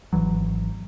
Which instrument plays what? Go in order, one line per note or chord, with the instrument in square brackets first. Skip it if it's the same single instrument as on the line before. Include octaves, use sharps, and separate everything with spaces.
[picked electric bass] G#1 E2 E3 F#3